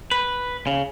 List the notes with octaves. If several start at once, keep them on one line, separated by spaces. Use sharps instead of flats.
B4
C#3